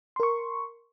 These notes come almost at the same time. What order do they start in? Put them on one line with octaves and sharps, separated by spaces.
C6 A#4 C#6